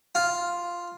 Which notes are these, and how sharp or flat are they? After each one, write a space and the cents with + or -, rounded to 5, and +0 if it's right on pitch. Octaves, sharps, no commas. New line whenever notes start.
F4 +0